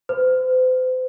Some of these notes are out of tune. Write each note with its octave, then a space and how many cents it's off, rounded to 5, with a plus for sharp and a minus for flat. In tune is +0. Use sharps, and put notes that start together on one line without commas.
C5 -40